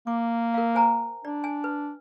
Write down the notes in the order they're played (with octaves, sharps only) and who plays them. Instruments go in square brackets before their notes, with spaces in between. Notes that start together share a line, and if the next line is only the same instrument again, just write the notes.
[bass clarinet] A#3 [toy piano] D6
[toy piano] A#4 F5
C5 G#5 A#5
[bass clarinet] D4 [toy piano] D5
[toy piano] G#5
B4